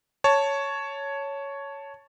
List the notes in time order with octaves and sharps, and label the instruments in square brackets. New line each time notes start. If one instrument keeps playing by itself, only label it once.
[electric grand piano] C#5 A5